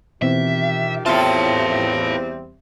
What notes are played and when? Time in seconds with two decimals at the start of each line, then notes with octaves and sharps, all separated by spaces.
0.22 B2 D#3 E3 C4 F4 G4 E5
1.06 E2 A2 G3 C4 F4 B4 E5 A5